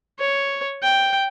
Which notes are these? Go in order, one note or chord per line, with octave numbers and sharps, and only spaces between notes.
C#5
G5